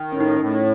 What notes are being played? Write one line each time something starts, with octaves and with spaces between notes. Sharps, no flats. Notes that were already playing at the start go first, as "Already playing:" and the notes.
Already playing: D#3
A2 C#4
D#4
C#4
A2